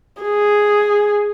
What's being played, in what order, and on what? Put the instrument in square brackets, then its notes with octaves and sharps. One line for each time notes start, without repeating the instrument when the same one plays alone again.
[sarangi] G#4